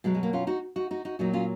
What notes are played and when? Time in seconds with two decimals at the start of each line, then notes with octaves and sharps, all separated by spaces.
0.04 B2 F#3 G#3
0.14 G#3
0.23 A#3
0.33 C#4 F4
0.47 D#4 F#4
0.76 D#4 F#4
0.91 D#4 F#4
1.05 D#4 F#4
1.19 A#2 F#3 D#4 F#4
1.33 C#4 F4